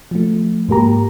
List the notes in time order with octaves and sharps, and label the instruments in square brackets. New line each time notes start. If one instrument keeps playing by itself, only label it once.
[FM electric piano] F3 A3
G#2 A#3 G4 A#5